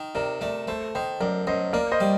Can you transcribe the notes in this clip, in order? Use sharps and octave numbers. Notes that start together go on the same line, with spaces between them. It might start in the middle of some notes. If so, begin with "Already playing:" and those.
Already playing: D#3
C3 A#4 D5
A3 A#4 D5
A3 A4 C5
D#3 C5 D#5
F#2 A#4 D5
F#2 C5 D#5
A#3 A#4 D5
C5 D#5
G3